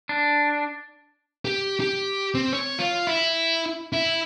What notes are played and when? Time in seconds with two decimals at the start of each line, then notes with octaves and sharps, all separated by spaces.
0.09 D4
1.45 G4
1.80 G4
2.35 C4
2.53 C#5
2.79 F4
3.07 E4
3.93 E4